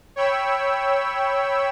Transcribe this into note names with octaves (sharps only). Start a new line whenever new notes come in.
C#5 G5 B5 E6